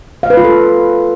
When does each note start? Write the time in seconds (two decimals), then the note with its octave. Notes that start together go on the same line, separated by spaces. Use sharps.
0.23 F5
0.30 B4
0.37 F4
0.44 A4